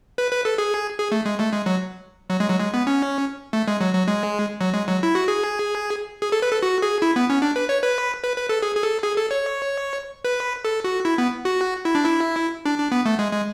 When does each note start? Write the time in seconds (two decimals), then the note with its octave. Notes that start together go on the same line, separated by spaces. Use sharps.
0.18 B4
0.32 B4
0.45 A4
0.58 G#4
0.99 G#4
1.12 A3
1.26 G#3
1.40 A3
1.52 G#3
1.66 F#3
2.30 F#3
2.40 G#3
2.49 F#3
2.60 G#3
2.74 B3
2.87 C#4
3.53 A3
3.68 G#3
3.81 F#3
3.94 F#3
4.08 G#3
4.61 F#3
4.74 G#3
4.88 F#3
5.03 E4
5.15 F#4
5.28 G#4
6.22 G#4
6.32 A4
6.42 B4
6.51 A4
6.63 F#4
6.82 G#4
7.02 E4
7.16 B3
7.30 C#4
7.42 D4
7.56 B4
7.69 C#5
7.83 B4
8.23 B4
8.36 B4
8.49 A4
8.62 G#4
8.75 G#4
8.83 A4
9.03 G#4
9.17 A4
9.31 C#5
10.25 B4
10.65 A4
10.84 F#4
11.05 E4
11.18 B3
11.45 F#4
11.85 E4
11.95 D4
12.05 E4
12.65 D4
12.78 D4
12.92 B3
13.05 A3
13.19 G#3
13.32 G#3